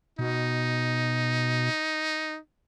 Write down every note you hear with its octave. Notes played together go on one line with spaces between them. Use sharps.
B2 D#4